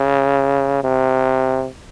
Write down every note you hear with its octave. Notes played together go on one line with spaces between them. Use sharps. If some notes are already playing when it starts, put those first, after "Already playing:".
Already playing: C#3
C3